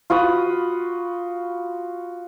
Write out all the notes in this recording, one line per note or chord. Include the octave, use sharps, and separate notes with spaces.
F4 F#4 B5 D#6